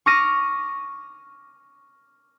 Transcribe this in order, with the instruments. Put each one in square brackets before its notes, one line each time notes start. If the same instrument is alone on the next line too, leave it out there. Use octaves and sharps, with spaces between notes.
[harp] C#6 D6 F6 A#6 D#7